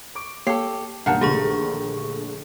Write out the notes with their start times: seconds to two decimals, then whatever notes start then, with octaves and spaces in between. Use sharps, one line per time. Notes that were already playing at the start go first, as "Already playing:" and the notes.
0.15 C#6 D6 D7
0.47 A#3 G4 A4 C#5 C7
1.06 B1 G2 D#3 A#3 F5 F#5 A5
1.21 A#1 D3 A3 G4 G#4 C#6